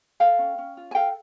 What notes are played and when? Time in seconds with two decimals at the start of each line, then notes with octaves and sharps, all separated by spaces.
0.20 A4 F5 G5
0.39 C#4
0.58 C#4
0.77 F4
0.91 G#5
0.95 A4 F5 G5